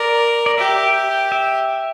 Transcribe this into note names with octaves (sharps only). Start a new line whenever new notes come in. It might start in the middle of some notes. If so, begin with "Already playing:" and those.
Already playing: A#4 D5
D5
G4 E5
E5